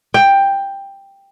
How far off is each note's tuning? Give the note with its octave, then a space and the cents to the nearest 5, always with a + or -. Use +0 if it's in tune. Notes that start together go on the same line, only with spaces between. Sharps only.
G5 +10